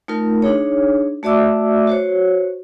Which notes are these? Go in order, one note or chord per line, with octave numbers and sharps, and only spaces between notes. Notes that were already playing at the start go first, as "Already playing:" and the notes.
A3 D#4 F4 A#4
D4 D#4 G#4 C#5
A3 F#4 D5 E5 D6 E6
F#4 C5 C#5